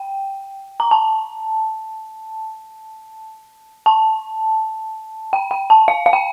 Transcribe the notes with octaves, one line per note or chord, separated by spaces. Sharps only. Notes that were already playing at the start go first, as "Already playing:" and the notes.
Already playing: G5
A#5
A5
A5
G5
G5
A5
F5
F5
G5